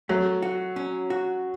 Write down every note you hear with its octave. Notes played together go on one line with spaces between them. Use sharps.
F#3 A3
F#4
C#4
F#4